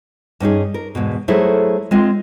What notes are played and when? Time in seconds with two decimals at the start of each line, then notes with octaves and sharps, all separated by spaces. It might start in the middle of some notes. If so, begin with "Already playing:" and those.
0.40 G2 C#4 D#4 G#4
0.74 A#4
0.95 E2 G#2 B2
1.28 F#3 A3 E4 G#4 A4 C5
1.91 G#3 C4 F4